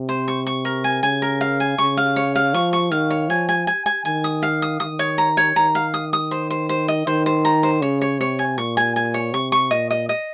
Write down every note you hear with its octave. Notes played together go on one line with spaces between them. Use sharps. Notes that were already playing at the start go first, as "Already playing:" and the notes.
Already playing: C3
C5
C#6
C#6
A#4
G#5
C#3 G#5
A#4
F5
G#5
C#3 C#6
F5
C#5
F5
F3 C#6
C#6
D#3 F5
C#5
F3 G#5
G#5
G#5
G#5
D#3 G#5
D#6
F5
D#6
D#3 D#6
C#5
A#5
C#5
D#3 A#5
F5
D#6
D#6
C5
C5
C5
D#5
D#3 C5
C5
A#5
C5
C#3 C#5
C#5
C3 C#5
G#5
A#2 C#6
G#5
G#5
C#5
C3 C#6
C#6
A#2 D#5
D#5
D#5